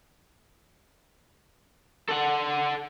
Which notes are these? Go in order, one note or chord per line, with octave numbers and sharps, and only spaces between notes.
A4 F#5